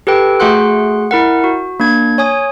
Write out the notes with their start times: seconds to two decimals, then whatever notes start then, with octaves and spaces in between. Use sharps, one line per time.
0.07 G4 A4 B4 G5
0.40 A3 F#4 G#4 F#5 C6 F#6
1.11 E4 A#4 F#5
1.44 F#4
1.80 A#3 D4 G#6
2.18 C#5 G#5 D#6